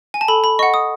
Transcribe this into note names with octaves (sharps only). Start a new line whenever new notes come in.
G#5
A5
A4 B5
B5
D#5 F#5 C#6
D#6